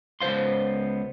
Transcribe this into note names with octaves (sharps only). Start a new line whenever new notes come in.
C#2 B3 C5 F5 C6